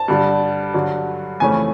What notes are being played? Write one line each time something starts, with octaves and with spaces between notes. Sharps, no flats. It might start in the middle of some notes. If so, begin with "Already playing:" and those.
Already playing: A5
G2 D3 G3
G2 D3 F#3
F2 C#3 E3 A3 C#4 G#5